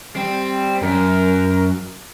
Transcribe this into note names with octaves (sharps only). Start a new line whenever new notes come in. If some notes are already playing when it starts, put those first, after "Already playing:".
G3 C4
F#2 A#4